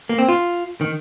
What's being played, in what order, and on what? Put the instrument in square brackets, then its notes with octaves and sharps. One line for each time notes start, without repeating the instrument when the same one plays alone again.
[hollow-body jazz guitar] A#3
C4
F4
D#3